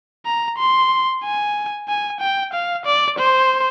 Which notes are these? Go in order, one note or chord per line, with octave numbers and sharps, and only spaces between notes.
A#5
C6
G#5
G#5
G5
F5
D5
C5